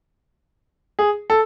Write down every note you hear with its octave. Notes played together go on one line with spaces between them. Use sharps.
G#4
A4